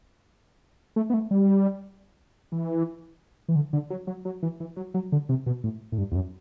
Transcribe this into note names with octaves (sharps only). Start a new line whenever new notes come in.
A3
B3
A3
G3
E3
E3
D3
D3
F#3
F#3
F#3
E3
E3
F#3
F#3
D3
C3
B2
A2
A2
G2
E2
F#2